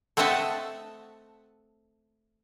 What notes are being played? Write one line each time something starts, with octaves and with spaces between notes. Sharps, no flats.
A3 C4 D#5 E5 F#5 A5